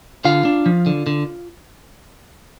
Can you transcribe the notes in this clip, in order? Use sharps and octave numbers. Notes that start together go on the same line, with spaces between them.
D3 F4 F5
D4
F3
D3
D3